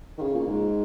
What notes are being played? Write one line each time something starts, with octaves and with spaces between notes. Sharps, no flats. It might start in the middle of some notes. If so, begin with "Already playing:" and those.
D#3
C#3
A#2
G#2